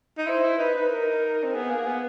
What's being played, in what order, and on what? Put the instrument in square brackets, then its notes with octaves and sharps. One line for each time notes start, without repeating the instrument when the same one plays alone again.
[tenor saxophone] D#4
[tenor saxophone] E4 [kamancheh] C5
[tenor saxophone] E4
[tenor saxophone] D#4 [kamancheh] B4
[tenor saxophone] D#4
[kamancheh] A#4
[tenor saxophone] C4
[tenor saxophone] B3 [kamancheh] G#4
[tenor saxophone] A#3
B3